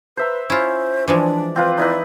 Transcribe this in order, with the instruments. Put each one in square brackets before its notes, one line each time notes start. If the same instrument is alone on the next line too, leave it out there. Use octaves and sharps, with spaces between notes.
[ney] B4 [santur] C5 E5 A#5
[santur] C#4 [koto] E4 F4 [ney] C5
[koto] E3 F3 G#3 [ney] D4 [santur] D5
[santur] C4 F4 B4 [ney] C5
[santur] D#4 E4 B4 [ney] D5